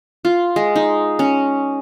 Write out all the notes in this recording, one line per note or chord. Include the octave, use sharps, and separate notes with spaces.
F4
G#3
D#4
C#4